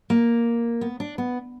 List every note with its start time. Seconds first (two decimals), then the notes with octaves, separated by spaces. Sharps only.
0.10 A#3
0.81 B3
1.00 D4
1.18 B3